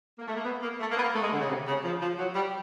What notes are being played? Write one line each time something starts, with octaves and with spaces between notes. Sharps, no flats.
A#3
A3
A#3
B3
A#3
A3
A#3
B3
A#3
A3
G#3
D3
C#3
C3
C#3
F3
F3
F#3
G3